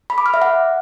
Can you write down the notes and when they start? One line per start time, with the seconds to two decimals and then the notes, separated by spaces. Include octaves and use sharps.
0.10 B5
0.18 D6
0.26 F6
0.34 E5
0.42 F#5